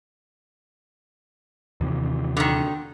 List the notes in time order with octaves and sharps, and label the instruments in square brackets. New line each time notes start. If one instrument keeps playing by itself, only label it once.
[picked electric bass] D#2 C3 E3
[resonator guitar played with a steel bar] D3 D#3